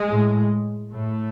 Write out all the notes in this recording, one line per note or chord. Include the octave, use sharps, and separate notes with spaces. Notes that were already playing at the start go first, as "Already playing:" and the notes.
Already playing: G#3
A2
A2 A3